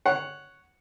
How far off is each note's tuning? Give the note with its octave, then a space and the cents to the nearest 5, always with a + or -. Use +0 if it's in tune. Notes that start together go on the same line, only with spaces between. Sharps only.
C#5 +0 F#5 +0